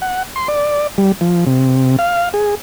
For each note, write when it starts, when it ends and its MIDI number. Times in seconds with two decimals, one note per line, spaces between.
0.02 0.23 78
0.36 0.48 84
0.48 0.87 74
0.98 1.12 55
1.21 1.45 53
1.47 1.96 48
1.99 2.29 77
2.34 2.55 68